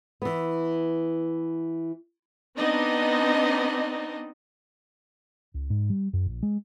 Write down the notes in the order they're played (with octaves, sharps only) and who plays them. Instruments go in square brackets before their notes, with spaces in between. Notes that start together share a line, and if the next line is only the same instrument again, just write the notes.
[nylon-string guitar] E3 B3
[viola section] B3 C4 D4 D#4 D#5
[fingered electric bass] C#2
G#2
G3
F#2
A#1
G#3